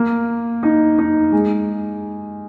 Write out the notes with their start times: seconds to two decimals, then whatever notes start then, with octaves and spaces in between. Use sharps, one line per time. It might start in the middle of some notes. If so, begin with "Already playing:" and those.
Already playing: A#3
0.63 D#4
0.98 D#4
1.32 G#3